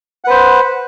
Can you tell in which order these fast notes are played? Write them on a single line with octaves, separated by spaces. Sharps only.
F#5 B4 C5